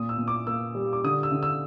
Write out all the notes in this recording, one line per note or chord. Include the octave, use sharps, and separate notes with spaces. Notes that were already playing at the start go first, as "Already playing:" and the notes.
Already playing: A#2 D#6
E6
A#2
D6
A#3 E6
G3
D6
D3 D#6
E6
D3
E6